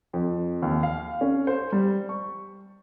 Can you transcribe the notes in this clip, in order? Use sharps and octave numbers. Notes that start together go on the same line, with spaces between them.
F2
D#2
F5
C#4
C5
G3
C#6